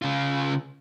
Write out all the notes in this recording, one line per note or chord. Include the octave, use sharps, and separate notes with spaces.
C#3 F4